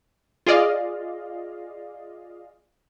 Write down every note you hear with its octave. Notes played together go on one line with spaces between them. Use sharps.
F4 G#4 D5 D#5 F5